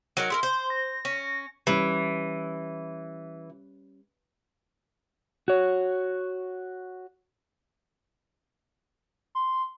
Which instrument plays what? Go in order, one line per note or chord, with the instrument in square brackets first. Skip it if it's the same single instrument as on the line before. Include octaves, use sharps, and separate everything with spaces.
[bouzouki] F#3 D#4 A#4
[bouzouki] E4 G#4 A#4 [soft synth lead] C6
[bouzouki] C5
[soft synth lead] A#6
[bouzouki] C#4
[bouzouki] E3 [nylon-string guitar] G3 C#4
[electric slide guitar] F#4 C#5
[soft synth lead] C6